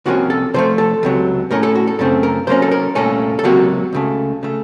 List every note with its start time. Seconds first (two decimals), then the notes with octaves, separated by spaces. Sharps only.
0.06 C2 C3 F3 A#3 C#4 F#4
0.30 A4
0.54 C3 F3 A3 C5
0.78 A4
1.03 C#2 C3 F#3
1.51 A2 A3 C#4 A#4
1.63 A4
1.75 F#4
1.87 A4
1.99 F#2 C#3 A3 C4 A4
2.23 A#4
2.47 C3 F#3 A#3 C#4 C5
2.62 A4
2.71 A#4
2.95 C2 A#2 A3 C#4 A4
3.39 A4
3.44 C#2 C3 F#3 A#3 F#4
3.93 C#2 C#3 A3
4.43 C#3 A3